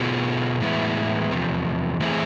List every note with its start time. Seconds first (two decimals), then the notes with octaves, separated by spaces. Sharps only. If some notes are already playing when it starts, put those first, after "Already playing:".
Already playing: B2 B3 F4 G#4
0.60 A2 E3 G#3 B3 E4
1.30 E2 C3 F3
2.00 E3 A3 C4 E4 G#4